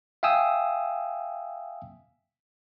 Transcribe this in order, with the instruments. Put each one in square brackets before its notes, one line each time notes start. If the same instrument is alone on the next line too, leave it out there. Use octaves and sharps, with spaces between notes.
[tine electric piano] E5 F5 G5 G#5 D#6 E6